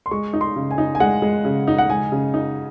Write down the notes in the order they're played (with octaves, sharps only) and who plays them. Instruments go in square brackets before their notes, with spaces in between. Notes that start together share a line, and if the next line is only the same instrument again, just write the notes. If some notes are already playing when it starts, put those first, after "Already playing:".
[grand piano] C6
[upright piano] G#3 [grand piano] C#6
[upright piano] D#4
[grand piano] C6
[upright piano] C#3
[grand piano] G#5
[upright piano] D#4
[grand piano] G#5
[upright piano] G#3 [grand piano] F#5
[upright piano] G#3
C#3
D#4
[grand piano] F#5
[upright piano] G#3 [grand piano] G#5
[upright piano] C#3
D#4